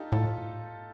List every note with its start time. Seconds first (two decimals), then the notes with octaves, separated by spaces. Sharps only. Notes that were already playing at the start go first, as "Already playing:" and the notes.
Already playing: D4 D#4 F4 G4 A4
0.12 A2 F4 A4